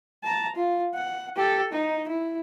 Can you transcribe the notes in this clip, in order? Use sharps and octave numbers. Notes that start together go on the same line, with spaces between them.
A5 A#5
F4
F#5
G4 A4
D#4
E4